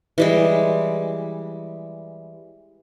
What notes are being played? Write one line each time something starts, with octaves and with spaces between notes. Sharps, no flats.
E3 G3 G#3